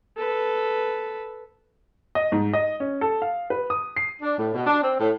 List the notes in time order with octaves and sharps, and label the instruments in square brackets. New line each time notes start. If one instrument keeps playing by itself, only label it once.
[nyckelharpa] A4 B4
[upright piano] D#5
G#2
D#5
C#4
A4
F5
B4
D#6
C7
[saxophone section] D4
A2
B2
D4
C4
A2